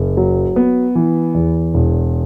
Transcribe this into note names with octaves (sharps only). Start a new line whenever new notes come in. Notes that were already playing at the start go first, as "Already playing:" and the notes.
Already playing: F#1
F#3
B3
E3
E2
E1